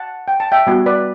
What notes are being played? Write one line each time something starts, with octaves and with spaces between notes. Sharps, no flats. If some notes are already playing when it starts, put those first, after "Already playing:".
Already playing: F#5 A5
G5
A5
E5 G5
G3 B3 F#4
B4 D5